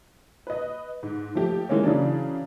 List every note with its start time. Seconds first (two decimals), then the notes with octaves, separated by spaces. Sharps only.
0.47 B4 D#5
1.03 G#2
1.35 F3 A3 G4
1.69 E3 G#3 A#3 C#4
1.84 C#3 E3 F#3 D4